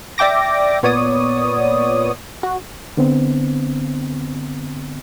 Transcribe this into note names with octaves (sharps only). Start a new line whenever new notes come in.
D5 E5 G5 D6 A#6
A#2 B3 C#5 D5 D#6
F#4
D3 B3 C4